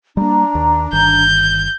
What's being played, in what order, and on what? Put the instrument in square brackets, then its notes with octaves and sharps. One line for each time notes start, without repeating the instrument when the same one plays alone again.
[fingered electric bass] G3 A#3 [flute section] D4 A#5
[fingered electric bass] D#2
[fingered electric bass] G1 D#3 [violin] G6